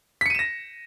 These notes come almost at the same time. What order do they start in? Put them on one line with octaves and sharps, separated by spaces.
B6 C#7 D#7 E7 A#6